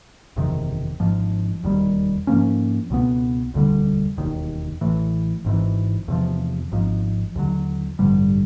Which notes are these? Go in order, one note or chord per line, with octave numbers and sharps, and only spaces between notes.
F#1 E2 C3 D#3
G#1 G#2 F3
E1 D#2 D#3 G3
G#2 F3 A#3 C#4
C#2 B2 F#3 B3
E1 D2 D3 G3
E1 D#2 D#3
A1 A2 E3
G#1 G#2 E3
E2 C3 F3
G#1 G#2 F3
D#2 D3 F#3
A1 G2 D3 G3